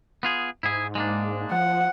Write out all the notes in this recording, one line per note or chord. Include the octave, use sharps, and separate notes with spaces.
B3 F4 G#4
G#2 E4 G#4
G#3 A#3 D4
F3 F#5